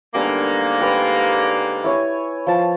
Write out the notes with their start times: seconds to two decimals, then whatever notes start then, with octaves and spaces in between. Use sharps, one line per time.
0.15 G#2 D3 G3 A#3 B3 D4
0.81 G4 B4 D5
1.84 E4 C#5 G#5
2.47 F3 A5